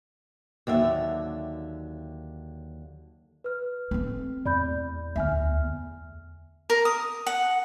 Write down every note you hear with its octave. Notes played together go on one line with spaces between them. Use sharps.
D#2 D3 F#3 E5
B4 F6
A3 C4
E2 D5 B5 G6
D2 B3 E5 G#5 F6
A#4
D#6
F#5